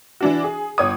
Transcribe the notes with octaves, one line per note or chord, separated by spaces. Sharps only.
E3 D4 F#4
G#4
G1 C#5 D#6